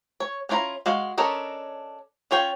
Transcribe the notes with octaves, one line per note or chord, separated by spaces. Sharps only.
C#5
C#4 D4 E4 F4 A#5
G#3 F#4 F5
C#4 D4 A4 A#4 D#5
C#4 F4 C#5 G5